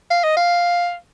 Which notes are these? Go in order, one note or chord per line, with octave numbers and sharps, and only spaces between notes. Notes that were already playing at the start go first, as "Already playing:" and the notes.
F5
D#5
F5